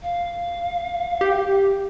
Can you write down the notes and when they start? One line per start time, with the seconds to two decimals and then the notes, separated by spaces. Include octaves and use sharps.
0.02 F5
1.21 G4